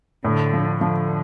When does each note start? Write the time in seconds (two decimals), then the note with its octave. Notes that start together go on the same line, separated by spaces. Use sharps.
0.24 A2 D3
0.53 F3
0.81 D3 F3